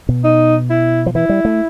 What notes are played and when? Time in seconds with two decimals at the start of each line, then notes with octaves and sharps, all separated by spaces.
0.09 B2
0.24 D#4
0.70 E4
1.06 F3
1.15 E3 E4
1.29 G3
1.45 A3